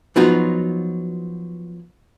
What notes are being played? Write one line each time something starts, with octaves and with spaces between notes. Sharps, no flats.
F3 F#3 B3 D#4 F4 F#4